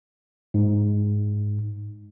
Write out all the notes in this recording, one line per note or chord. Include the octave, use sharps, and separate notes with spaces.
G#2